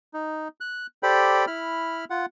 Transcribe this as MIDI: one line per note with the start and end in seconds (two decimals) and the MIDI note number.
0.14 0.48 63
0.61 0.87 90
1.03 1.45 67
1.03 1.45 69
1.03 1.45 72
1.03 1.45 74
1.03 1.45 79
1.03 1.45 83
1.47 2.05 64
1.47 2.05 83
1.47 2.05 89
2.10 2.26 65
2.10 2.26 78